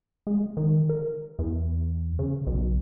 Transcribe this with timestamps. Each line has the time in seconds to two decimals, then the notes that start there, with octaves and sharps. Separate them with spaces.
0.27 G#3
0.57 D#3
0.89 A#4
1.39 E2
2.19 C#3
2.47 B1